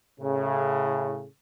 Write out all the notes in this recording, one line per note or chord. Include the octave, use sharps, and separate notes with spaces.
A2 C#3